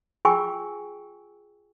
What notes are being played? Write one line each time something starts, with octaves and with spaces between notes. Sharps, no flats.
F4 G#4 G5 G#5 C#6 E6